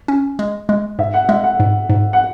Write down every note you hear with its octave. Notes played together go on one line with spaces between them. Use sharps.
C#4
G#3
G#3
G#2 E5
F#5
G#3 E5
F#5
G#2
G#2
F#5